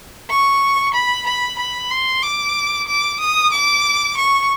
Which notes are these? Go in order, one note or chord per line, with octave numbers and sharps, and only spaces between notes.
C#6
B5
B5
B5
C6
D6
D6
D#6
D6
C#6